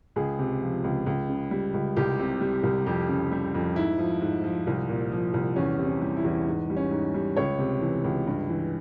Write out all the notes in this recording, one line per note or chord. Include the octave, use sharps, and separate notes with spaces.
C#2 G#4
C3
F3
C#2
C#2
C#3
G3
C#2
C2 G4
C3
G3
C2
F2 G4
C#3
G3
F2
G#2 E4
F3
G#2
F3
C2
A#2
F3
C2
E2 C#4
C3
C#4
G3
E4
E2
G#2
G3
C#4
G#2
G3
C#2 C#5
C3
E3
C#2
G2
E3